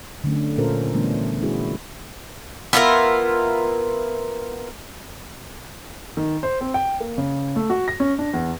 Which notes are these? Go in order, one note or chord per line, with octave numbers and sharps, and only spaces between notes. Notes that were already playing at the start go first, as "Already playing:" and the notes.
D3 F#3 A3 C#4
A#2 C#4 F4 A4 A#4 C5
D3 E3 G3 A3 B3 D4
G3 G#3 C#4 E4 F#4 G#4
B3 E4 F4 A#4
D#3
C5
C4
G5
A#3
C#3
A3
F#4
A#6
C#4
D4
E2